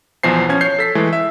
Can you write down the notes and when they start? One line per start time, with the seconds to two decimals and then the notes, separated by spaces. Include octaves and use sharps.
0.23 B1 E2 F3 C5 G#5 C7
0.49 F3 C#4 G#6
0.61 C#5 G6 C7
0.79 A4 B6 C7
0.95 E3 G#3 A3
1.13 E5